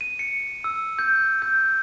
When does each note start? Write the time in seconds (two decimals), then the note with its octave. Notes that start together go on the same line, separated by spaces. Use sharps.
0.01 D#7
0.19 C#7
0.64 E6
0.99 G6
1.42 G6